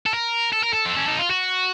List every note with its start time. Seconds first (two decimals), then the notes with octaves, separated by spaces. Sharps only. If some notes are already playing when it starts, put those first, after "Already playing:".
0.06 A4
0.13 A#4
0.52 A4
0.63 A#4
0.73 A4
0.86 C4
0.96 C#4
1.08 D#4
1.19 F4
1.30 F#4